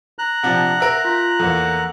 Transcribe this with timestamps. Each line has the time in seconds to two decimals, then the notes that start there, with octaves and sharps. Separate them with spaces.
0.19 A#5 F#6
0.43 C3 F3 D4 F#5
0.80 A#4 E5
1.05 F4
1.40 E2 A#3 A4 F#5